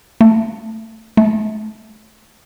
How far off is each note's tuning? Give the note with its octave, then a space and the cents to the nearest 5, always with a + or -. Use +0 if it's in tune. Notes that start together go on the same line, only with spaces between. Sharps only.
A3 +10
A3 -35